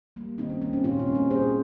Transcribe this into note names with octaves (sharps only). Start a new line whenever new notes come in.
G3 A#3
D#3 C4 D#4
C#4
G3 A#3 C4
C#4
A#2 C#4 F4
C#4
A#3
G3 C4 D#4
A#2 G#4 C5